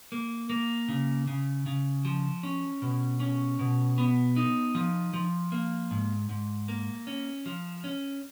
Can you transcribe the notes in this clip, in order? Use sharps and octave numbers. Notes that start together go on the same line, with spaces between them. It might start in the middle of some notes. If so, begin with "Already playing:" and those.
A#3
A#3
C#3
C#3
C#3
F3
C#4
B2
C#4
B2
B3
D#4
F3
F3
A#3
G#2
G#2
A#3
C#4
F3
C#4